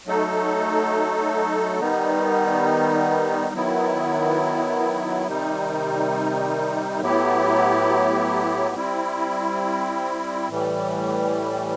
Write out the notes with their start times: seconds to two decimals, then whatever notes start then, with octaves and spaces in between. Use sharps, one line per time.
0.06 F#3 A3 D#4 A4
1.80 D#3 G3 B3 D#4
3.54 D#3 F#3 B3 E4
5.27 C3 D#3 G3 D#4
7.01 A2 F#3 B3 E4 G4
8.75 G3 C4 E4
10.49 A2 E3 G3